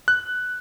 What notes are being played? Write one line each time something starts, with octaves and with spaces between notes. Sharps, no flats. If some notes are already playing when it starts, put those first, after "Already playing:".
F#6